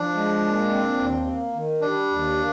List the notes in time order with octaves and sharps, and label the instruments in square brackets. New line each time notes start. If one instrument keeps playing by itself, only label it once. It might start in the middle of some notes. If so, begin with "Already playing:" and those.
Already playing: [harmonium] F3 [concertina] D4
[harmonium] G#3
A#2
C4
D#2
A#3
D#3
[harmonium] G3 [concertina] D4
[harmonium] D#2
A#3